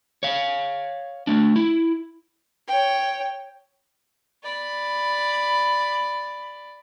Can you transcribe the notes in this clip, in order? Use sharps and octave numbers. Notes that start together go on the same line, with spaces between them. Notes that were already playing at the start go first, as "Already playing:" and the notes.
C#5 F5
A3 D4
E4
C#5 G5
D5 B5